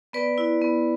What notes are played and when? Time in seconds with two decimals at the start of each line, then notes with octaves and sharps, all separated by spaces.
0.13 B3 B4 D5
0.38 E4
0.62 B3